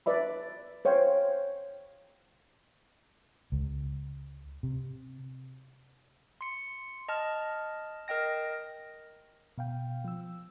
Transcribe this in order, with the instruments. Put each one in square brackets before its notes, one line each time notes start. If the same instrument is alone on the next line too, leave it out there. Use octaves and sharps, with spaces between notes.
[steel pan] B4 D5 E5 B5
C5 C#5 F5 G5
[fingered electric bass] C#2
C3
[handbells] C6 C#7
D#5 A5 F6
A#4 D#5 G5 A#6
[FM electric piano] B2 F5 G5
F3 E6